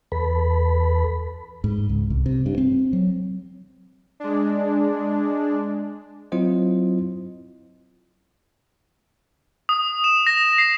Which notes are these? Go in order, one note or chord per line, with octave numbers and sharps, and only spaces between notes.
E2 A4 B4 B5
G#2
C#2
C2
C3
G2
C4
F#3
G#3 D4
F#3 C4 E4 F4 C5 D#5
D#6
E7
A#6
C7